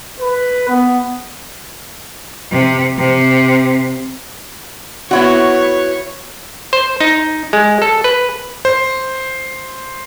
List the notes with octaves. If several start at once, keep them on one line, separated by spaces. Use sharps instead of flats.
B4
B3
C3
C3
B3 E4 F#4 C#5
C5
D#4
G#3
A4
B4
C5